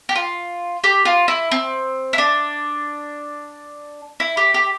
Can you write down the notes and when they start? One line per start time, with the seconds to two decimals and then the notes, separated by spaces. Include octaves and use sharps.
0.09 G4
0.15 F4
0.84 G4
1.05 F4
1.28 E4
1.51 C4
2.13 E4
2.18 D4
4.20 E4
4.37 G4
4.54 G4